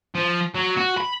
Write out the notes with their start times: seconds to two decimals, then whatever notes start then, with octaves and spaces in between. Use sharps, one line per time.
0.15 F3
0.55 F#3
0.77 F#4
0.97 B5